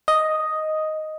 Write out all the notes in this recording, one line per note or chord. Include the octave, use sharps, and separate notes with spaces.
D#5